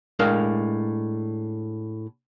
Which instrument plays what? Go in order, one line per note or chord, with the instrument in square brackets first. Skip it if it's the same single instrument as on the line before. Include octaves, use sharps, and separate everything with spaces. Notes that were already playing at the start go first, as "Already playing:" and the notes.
[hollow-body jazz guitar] A2 G#3 D4 A#4 F5